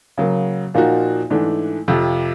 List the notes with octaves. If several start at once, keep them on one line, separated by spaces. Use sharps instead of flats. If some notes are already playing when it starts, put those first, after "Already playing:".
C#3 F#3 A#3
A#2 F3 A#3 D#4 F#4
G#2 E3 A3 D4
F2 C3 F3